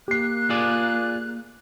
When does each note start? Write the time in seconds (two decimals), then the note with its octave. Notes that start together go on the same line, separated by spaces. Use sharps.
0.08 A#3 G4 F#6 C7
0.50 F4 G#4 D5